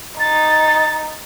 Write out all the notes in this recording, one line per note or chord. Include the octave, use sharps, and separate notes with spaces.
D#4 A6